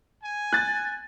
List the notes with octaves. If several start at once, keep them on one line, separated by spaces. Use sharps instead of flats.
G#5
F#6 A6